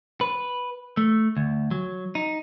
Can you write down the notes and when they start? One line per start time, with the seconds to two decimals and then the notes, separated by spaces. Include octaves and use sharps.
0.21 B4
0.97 A3
1.37 D2
1.71 F#3
2.15 D#4